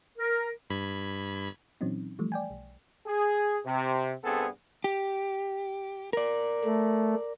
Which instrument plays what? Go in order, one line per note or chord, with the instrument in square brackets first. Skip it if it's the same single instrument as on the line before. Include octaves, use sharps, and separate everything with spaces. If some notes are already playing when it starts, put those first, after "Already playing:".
[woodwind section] A#4
[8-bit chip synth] G2 B5 G#6
[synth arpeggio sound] A#2 E3 F#3 C4 C#4 D#4
E3 F3 G3 A3
D5 G5 G#5
B1
[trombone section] G#4
C3
C2 G2 B3 C4 G#4 A4
[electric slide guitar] G4
A#4 D5
[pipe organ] A3